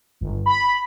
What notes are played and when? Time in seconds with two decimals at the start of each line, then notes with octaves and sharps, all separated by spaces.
0.21 G1
0.46 B5